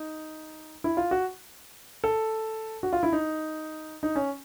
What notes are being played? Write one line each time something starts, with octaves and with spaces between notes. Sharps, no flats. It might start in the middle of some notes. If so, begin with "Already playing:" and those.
Already playing: D#4
E4
F4
F#4
A4
F#4
F4
E4
D#4
D#4
C#4